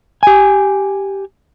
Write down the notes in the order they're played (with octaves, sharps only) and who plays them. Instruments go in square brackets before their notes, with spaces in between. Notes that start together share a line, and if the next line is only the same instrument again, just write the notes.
[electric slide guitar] G4 G#5